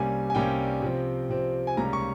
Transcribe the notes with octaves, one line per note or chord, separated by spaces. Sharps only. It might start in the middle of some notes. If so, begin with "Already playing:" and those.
Already playing: C2 C3 G3 A#3 C#4 G#5
G#5
C2 C3 G3 A#3 C#4 G5
C3 F3 C4
C3 F3 C4
G#5
C#2 C3 G3 A#3 C#4 A#5
C#6